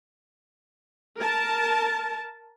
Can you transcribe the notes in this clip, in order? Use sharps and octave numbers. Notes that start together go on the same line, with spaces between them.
A#4 A5